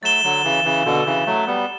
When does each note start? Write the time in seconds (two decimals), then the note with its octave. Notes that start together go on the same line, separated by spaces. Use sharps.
0.03 F#3 A3 A6 E7 G7
0.24 D3 F#3
0.44 C#3 E3
0.64 C#3 E3
0.85 B2 D3
1.06 C#3 E3
1.26 F#3 A3
1.47 G3 B3